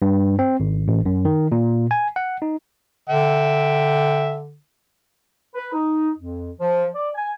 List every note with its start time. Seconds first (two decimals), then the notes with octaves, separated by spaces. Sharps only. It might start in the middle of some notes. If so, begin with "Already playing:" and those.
0.02 G2
0.39 C4
0.60 G#1
0.88 A1
1.06 F#2
1.25 D#3
1.52 A#2
1.91 G#5
2.16 F#5
2.42 D#4
3.09 D3 E5 G5
5.54 B4
5.72 D#4
6.17 F2
6.59 F3
6.94 D5
7.15 G#5